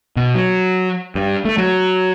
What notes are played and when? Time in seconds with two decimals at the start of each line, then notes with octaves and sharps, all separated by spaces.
0.17 B2
0.35 F#3
1.15 G2
1.45 A3
1.58 F#3